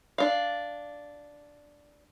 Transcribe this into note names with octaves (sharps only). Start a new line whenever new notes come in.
D4 F5